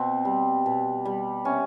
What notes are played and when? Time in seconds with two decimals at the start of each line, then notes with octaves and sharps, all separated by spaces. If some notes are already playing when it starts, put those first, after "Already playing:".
Already playing: B2 C4
0.25 G3
0.66 B2
1.05 G3
1.45 C3 C#4